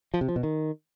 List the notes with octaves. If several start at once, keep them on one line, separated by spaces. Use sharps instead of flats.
F3
C3
F3
B2
D#3